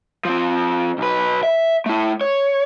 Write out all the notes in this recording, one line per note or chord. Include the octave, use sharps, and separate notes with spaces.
F3 C4
B1 B4
E5
A3 E4
C#5